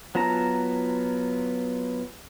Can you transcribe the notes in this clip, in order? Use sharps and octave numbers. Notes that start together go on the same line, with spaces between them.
F#3 B3 F4 A5 A#5